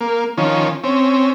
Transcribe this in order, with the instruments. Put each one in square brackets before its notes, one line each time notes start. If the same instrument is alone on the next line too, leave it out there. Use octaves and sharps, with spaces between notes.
[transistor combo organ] A#3
D#3 F3 C#4
C4 C#4